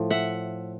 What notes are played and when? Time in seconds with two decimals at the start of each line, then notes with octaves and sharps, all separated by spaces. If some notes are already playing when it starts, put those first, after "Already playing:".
Already playing: A2 F3
0.10 E5 F#5